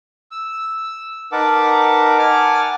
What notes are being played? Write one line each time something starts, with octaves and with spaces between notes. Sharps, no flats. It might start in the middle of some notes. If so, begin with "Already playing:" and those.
E6
D#4 A#4 B4 F#5 A5 D6
F#5 G#5 A5 D6 F6